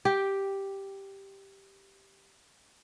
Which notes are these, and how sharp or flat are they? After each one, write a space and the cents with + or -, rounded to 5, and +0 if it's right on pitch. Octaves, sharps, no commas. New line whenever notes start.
G4 +0 G5 +10